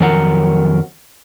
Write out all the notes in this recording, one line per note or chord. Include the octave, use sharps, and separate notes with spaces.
F2 D#3 F#3 A#4 F#5 A#5